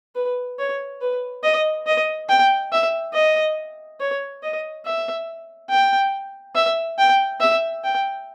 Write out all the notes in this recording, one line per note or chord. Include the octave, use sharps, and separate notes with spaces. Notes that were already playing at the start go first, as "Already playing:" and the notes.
B4
C#5
B4
D#5
D#5
G5
E5
D#5
C#5
D#5
E5
G5
E5
G5
E5
G5